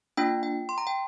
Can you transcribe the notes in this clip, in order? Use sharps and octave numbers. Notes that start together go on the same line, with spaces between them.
A#3 D4 F4 G5
G5
C6
A#5
G5